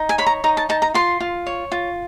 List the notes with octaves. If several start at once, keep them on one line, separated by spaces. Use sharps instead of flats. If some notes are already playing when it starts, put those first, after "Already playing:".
Already playing: D#4
G#5
C#5 B5
A#5
D#4 A#5
A5
D#4 A5
A#5
F4 C6
F4
C#5
F4